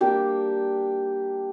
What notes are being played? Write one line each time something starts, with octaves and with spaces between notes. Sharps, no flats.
G3 A#3 D4 G4